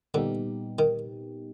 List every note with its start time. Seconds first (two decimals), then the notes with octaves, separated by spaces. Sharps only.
0.14 A#2 D3 G3 B3 D#4 G4
0.79 D#3